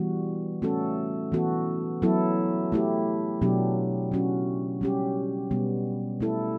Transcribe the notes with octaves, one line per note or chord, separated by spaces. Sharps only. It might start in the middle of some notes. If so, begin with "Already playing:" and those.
Already playing: E3 G3 B3 F#4
A3 C#4 F#4 A4
E3 B3 F#4 A4
F#3 B3 E4 A4
A3 E4 G4
B2 F#3 B3 D4 G4
F#3 C#4 F#4
G3 C#4 G4
B2 G3 B3
A3 E4 A4